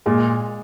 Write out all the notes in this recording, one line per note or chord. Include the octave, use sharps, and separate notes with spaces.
A#2 G#3